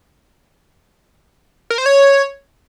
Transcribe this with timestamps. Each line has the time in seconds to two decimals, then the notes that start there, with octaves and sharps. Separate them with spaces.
1.70 A#4
1.78 C5
1.86 C#5